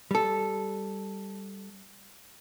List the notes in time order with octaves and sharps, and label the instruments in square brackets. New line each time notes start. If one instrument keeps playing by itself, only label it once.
[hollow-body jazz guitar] G3 A4